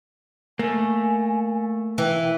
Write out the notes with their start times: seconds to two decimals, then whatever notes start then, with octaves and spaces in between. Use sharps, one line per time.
0.59 A3 A#3 G#5
1.98 E3 G5